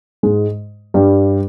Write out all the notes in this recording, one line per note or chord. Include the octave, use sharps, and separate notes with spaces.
G#2 G#3
G2 G3